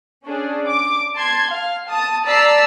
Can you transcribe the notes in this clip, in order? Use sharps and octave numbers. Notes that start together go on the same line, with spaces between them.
C#4 D4 G#4
D6
A5 C6 G#6
F5
A5 D#6
D5 A5 A#5 E6 B6 C7